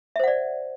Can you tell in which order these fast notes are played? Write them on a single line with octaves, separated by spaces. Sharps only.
E5 C5 F#5 D5